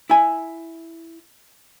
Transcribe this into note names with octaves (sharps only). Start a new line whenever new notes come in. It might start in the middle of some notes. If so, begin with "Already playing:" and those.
E4 G#5